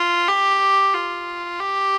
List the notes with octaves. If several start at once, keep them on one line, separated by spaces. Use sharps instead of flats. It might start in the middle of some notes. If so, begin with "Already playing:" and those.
Already playing: F4
G4
F4
G4